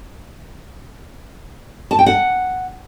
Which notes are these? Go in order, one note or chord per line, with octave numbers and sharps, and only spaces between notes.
A5
G5
F#5